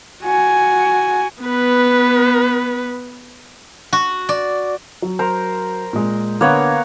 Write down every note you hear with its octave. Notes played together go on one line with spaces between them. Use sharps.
F#4 G#5
B3 B4
F#4
D5
F#3
A#4 C5
A#2 G#3
D3 A#3 B3 C#5 F#6